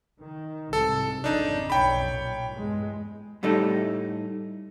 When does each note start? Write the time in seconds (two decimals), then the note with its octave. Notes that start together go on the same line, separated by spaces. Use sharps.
0.21 D#3
0.73 C2 G#2 C3 A4
1.24 G#1 F2 C#3 D4 D#4
1.70 B1 F2 C#5 G5 B5
2.09 A#2
2.52 E2 G2 G#3
3.43 A2 G3 A3 D#4